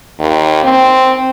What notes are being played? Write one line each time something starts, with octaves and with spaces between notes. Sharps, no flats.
D#2
C4